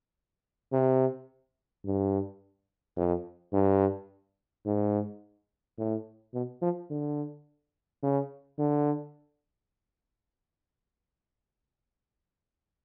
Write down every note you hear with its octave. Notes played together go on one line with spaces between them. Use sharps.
C3
G2
F2
G2
G#2
A2
B2
F3
D3
C#3
D3